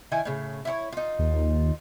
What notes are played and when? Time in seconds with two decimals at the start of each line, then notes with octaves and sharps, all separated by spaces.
0.12 D#3 E4 G#5
0.25 A2 C#3
0.65 E4 F4 C#5
0.92 D#4 F4
1.19 D#2